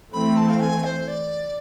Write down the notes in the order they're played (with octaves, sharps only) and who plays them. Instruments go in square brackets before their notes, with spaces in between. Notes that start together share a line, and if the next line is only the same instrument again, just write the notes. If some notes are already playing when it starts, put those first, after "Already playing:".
[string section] E3 A3 C4 [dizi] B5
[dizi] A5
F5
G#5
C5
D5